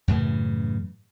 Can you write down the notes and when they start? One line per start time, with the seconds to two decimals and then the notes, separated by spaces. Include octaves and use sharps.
0.08 F#2 A2 C#3 E3